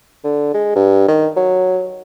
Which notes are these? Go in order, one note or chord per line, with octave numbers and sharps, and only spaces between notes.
D3
G#3
G2
D#3
F#3